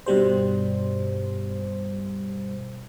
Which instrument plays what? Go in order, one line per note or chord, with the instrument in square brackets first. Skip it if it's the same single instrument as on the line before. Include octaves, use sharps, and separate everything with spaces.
[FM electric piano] G2 B2 G3 C5